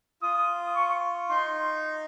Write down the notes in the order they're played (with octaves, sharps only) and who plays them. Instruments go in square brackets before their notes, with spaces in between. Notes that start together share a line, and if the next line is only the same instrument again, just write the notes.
[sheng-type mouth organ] F4 [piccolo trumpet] D#6
[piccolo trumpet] C#6
[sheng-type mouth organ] D#4 [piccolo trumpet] C6